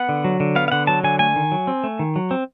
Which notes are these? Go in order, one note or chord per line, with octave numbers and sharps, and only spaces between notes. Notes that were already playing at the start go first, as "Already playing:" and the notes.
Already playing: B3 F#5
D3
F#3
D3
B3 F5
F5
D3 F#5
F#3 A5
D3 G#5
A3 G#5
D#3
F#3
C4
A3
D#3
F#3
C4